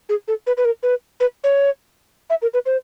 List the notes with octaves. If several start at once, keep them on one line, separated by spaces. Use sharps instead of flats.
G#4
A4
B4
B4
A#4
B4
B4
C#5
E5
A#4
B4
C5